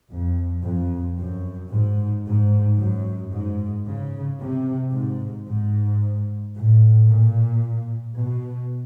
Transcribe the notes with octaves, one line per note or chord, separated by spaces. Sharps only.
F2
F2
F#2
G#2
G#2
F#2
G#2
C#3
C3
G#2
G#2
A2
A#2
B2